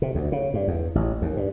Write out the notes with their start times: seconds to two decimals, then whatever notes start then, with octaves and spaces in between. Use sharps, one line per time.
0.02 C3
0.15 D2
0.32 C#3
0.54 G2
0.68 E2
0.95 A1
1.22 D#2
1.37 G2